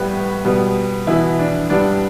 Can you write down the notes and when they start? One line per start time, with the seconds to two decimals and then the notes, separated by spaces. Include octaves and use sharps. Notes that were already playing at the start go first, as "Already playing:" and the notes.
Already playing: A2 G3 B3 B4
0.44 B2 G3 B3
1.07 B2 E3 B3 E4
1.39 D4
1.70 G2 G3 B3 D4